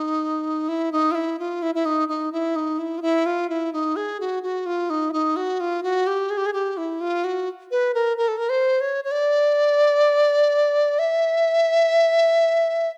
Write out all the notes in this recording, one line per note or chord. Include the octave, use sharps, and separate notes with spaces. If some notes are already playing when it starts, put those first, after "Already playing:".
Already playing: D#4
E4
D#4
F4
E4
F4
E4
E4
D#4
D#4
E4
D#4
E4
F4
E4
F4
E4
D#4
G#4
F#4
F#4
F4
D#4
E4
D#4
F#4
F4
F#4
G4
G#4
G4
G#4
G4
E4
F4
F#4
B4
A#4
A#4
A4
A#4
C5
C#5
C#5
D5
E5